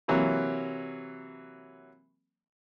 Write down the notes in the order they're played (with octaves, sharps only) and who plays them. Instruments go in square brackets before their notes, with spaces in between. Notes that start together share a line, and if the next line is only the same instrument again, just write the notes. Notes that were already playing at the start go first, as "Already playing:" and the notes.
[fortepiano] C3 E3 F#3 A#3